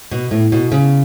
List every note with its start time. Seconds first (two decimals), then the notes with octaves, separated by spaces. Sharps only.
0.11 B2
0.31 A2
0.52 B2
0.72 C#3